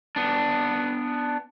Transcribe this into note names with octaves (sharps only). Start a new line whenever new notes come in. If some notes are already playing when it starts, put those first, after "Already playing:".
B3 D4